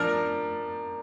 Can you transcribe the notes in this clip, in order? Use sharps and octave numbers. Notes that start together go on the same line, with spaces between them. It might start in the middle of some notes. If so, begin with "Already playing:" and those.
Already playing: F3 D4 A#4